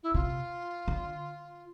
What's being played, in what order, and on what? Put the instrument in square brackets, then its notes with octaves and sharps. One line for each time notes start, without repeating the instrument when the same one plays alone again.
[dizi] E4
[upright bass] C3 [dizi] F4
[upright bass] D3